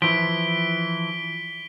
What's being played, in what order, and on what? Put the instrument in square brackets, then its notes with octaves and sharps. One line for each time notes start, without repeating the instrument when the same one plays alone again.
[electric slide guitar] E3 F3 [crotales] B6 D7 G7